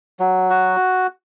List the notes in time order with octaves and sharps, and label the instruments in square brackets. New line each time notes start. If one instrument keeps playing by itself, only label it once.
[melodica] F#3
F#4